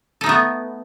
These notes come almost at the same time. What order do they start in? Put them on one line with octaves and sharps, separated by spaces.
A4 D#4 A3 B3